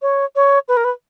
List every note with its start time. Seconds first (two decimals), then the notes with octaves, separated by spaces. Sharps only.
0.02 C#5
0.36 C#5
0.68 B4
0.77 A#4
0.85 B4